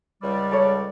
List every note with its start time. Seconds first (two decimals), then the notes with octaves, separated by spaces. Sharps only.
0.22 C#2 G3 D5
0.51 A4 C#5